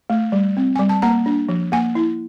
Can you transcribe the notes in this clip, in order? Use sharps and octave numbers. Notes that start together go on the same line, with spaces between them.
A3
G3
C4
G3 G#5
A5
A#3 A#5
D4
F3
A#3 G#5
E4